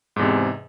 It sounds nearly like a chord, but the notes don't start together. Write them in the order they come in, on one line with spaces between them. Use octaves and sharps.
G#2 E2 C3